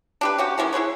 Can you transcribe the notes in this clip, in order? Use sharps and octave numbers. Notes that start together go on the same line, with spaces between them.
D4 G4 B4
C#4 F#4 G4
D#3 E3 G#3 C#4
E4 G#4 B4 C#5